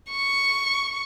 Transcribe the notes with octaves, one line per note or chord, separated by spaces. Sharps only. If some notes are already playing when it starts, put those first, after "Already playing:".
C#6